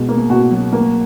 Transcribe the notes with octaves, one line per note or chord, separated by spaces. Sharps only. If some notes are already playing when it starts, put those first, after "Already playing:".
Already playing: B2 G#3
A#3
B2 F#4
F#3
A#3